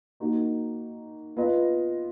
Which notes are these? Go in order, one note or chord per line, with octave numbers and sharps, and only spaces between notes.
A#3 D#4 F#4
B3 F4 B4 D#5